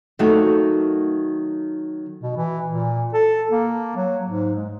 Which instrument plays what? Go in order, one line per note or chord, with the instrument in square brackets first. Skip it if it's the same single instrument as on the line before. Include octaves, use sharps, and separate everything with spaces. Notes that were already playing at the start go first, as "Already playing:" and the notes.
[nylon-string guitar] D#3 F#3 A3 A#3 D#4 F#4
[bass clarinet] B2
E3
A#2
A4
A#3
F#3
G#2
G#3